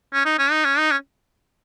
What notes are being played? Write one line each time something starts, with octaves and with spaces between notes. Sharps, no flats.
C#4
D#4
C#4
D#4
C#4
D#4
C#4